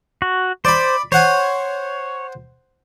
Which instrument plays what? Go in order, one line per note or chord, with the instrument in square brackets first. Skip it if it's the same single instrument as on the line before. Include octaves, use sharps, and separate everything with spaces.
[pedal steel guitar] F#4
[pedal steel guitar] C5 [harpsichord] D5 B5
[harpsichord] C5 F#5 G#5 [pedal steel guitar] C#5